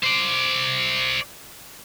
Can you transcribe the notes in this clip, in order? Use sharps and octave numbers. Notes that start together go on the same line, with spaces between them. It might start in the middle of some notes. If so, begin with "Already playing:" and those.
C5 D5